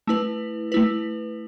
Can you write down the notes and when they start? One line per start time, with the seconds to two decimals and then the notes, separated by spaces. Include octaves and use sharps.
0.07 A3 E4 B4
0.72 A3 E4 B4